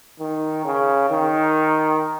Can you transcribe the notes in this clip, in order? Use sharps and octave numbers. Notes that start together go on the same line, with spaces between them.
D#3
C#3
D#3